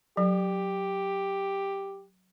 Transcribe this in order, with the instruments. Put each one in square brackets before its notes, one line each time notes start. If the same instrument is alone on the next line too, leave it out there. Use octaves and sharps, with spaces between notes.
[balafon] F#3 [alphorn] G4